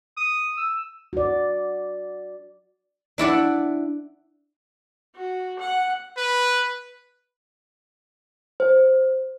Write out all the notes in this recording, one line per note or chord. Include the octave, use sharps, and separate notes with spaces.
D#6
E6
F#4 D5
D4 E4 D5 F#5
F#4
F#5
B4
C5